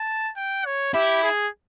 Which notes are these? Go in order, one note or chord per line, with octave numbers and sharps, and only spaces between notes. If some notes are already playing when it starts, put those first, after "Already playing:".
Already playing: A5
G5
C#5
E4 G4
G#4